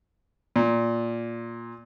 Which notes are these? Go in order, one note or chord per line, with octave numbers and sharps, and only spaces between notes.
A#2